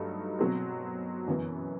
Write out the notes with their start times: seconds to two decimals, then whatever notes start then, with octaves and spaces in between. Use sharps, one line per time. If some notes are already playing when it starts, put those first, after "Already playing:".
Already playing: G2 F#3 A3 D#4 A4
0.39 B2 F#3 C4
1.27 F#2 E3 B3